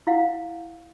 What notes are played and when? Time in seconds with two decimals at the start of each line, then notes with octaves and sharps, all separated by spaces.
0.07 E4 F5 F#5